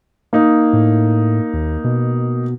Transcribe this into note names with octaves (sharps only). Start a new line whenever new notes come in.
A#3 D#4
A2
D#2
B2